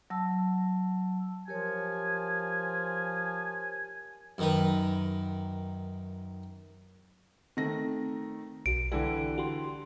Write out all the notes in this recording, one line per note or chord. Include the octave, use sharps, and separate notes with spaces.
F#3 A5 E6
F3 G4 A#4 C#5 G#5
F#2 D#3 B4
D#3 A3 C4 A#6
B1 F#4 D7
D3 E3 G3 G4
F#4 G4 C6